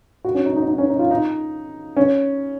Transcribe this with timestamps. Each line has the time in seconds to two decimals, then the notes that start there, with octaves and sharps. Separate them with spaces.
0.25 F#4
0.35 C#4
0.46 D#4
0.56 D#4
0.68 D#4
0.78 C#4
0.90 D#4
0.99 F4
1.11 D#4
1.97 C#4